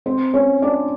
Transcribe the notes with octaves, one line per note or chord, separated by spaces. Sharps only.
C4 C5
C#4 C#5
D4 D5